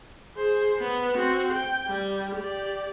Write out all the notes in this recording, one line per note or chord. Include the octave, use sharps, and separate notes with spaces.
G#4 C5
B3
C4 F#4
G5
G3
G4 D5